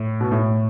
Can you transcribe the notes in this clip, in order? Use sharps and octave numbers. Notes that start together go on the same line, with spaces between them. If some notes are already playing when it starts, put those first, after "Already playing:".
Already playing: A2
B2
A2